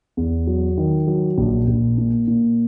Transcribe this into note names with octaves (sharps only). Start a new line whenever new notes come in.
E2
F#3
D#3
F#3
A#1
A#1
A#2
A#2